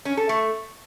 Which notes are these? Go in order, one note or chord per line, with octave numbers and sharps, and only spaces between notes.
C#4
A4
A3